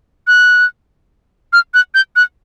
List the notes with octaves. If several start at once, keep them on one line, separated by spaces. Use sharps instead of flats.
F#6
F6
F#6
G6
F#6